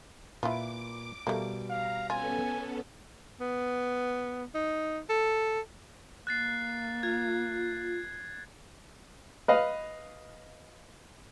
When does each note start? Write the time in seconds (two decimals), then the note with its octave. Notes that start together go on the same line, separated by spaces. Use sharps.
0.43 A#2 E4 F4 B4 D6
1.27 B2 G3 A3 A#3
1.70 F5 A#5
2.10 B3 C#4 F4 A4 G#5
3.41 B3
4.55 D#4
5.09 A4
6.27 A#3 F#6 A6 C7
7.03 F4 G#6
9.48 B4 D#5 F5